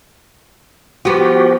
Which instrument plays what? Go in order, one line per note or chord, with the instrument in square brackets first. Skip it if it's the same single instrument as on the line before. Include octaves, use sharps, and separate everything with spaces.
[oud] F3 B3 [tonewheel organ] F#4 G4